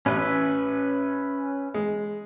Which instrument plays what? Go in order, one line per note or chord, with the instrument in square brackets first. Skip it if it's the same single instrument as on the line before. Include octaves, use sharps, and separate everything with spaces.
[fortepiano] A1 [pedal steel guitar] C#4 B4 E5
[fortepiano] G#3